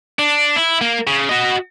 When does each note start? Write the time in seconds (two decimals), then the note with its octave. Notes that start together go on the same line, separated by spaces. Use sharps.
0.19 D4
0.56 E4
0.81 A#3
1.07 C#3
1.29 F#4 D#5